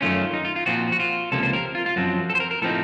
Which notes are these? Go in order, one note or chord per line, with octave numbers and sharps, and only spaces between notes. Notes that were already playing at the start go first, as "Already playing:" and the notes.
F#2 D#3 A3 C#4 F4
D#4
F4
F4
A#2 F3 C4 F#4
F#4
F4
C#2 C3 F3 A#3 A4
C5
A#4
F4
F4
F#2 F3 C4 F#4
A4
C5
A#4
A#4
A2 F3 C4 D#4 A4